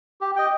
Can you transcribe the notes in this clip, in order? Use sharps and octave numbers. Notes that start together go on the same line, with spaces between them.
G4
D#5 G5